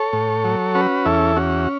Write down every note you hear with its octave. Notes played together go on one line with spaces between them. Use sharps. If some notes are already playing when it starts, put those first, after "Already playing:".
Already playing: A4 C#5
A2
F#3
C#4 F#4 B4
E2 E4 A4
C#4 F#4